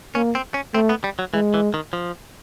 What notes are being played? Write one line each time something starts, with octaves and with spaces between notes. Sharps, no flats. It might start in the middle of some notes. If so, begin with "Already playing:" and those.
A#3 C#4
C4
C#4
A3 C4
B3
G3
F#3
E3 G#3
E3
D#3
F3